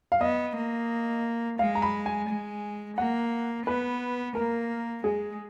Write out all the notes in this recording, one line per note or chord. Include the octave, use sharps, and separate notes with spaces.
F5
B3 D#5
A#3
G#3 F5
A#5
B5
G#5
G#3
A#3 F#5
B3 B4
A#3 A#4
G#3 G#4